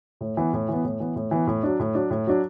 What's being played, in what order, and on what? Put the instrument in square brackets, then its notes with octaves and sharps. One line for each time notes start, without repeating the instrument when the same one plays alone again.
[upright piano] A2
E3 B3
A2
E3 B3
A2
E3 B3
A2
E3 B3
A2
F#3 D4
A2
F#3 D4
A2
F#3 D4